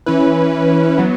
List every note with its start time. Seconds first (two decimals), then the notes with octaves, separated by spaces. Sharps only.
0.06 E3 C#4 E4 B4
0.98 F#3 B3